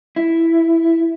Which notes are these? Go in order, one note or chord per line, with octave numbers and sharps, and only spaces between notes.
E4